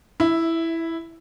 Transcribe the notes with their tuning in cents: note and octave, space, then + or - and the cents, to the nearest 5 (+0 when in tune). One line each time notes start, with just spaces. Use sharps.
E4 +0 E5 -25